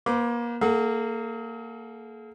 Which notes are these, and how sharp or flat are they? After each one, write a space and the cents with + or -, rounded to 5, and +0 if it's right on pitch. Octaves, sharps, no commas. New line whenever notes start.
A#3 +30 C5 -45 D6 +0
A#3 -20 G#4 +45 F#5 -10